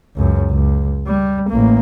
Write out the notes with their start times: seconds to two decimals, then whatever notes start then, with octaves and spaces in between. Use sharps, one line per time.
0.16 C#2 F#2
0.51 C#2
1.07 G3
1.49 A1 A#3